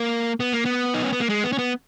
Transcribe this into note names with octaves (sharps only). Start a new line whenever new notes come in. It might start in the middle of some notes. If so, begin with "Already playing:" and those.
Already playing: A#3
B3
A#3
B3
D#4
C#4
B3
A#3
G#3
B3
C#4
B3